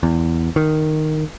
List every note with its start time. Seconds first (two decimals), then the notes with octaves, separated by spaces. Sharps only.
0.03 E2
0.56 D#3